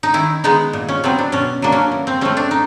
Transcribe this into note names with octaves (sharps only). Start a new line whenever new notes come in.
D#4
D#3 E4
G#3 B3 D#4
A#2
C#4
F#3 B3 C4
D4
B2 C#4
F#3 A#3 D4
C#4
E3
C4
A3 C4 C#4
D4
D#4